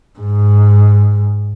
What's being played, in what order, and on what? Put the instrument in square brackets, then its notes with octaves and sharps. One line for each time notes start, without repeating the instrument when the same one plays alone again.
[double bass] G#2